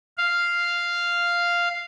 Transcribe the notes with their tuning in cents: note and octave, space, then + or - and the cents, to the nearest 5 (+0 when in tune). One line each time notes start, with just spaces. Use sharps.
F5 -5